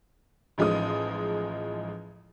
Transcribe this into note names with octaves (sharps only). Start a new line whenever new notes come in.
A1 F3 G#3 D#4 D#6